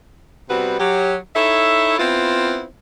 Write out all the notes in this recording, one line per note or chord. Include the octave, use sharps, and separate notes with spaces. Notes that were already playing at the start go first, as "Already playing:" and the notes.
C3 G3 B3 C4 F#4 B4
F#3 G4
D#4 E4 A4 C#5 E5
B3 C4 E4 F4